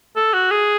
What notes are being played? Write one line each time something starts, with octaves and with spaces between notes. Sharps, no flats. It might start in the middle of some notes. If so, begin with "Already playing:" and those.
A4
F#4
G#4